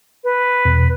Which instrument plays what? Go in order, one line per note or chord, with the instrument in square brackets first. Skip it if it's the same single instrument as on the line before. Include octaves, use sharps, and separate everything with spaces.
[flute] B4
[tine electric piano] E2 B2